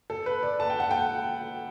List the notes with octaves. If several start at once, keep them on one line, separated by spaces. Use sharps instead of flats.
A4
B4
D5
A5
G5
F#5
G5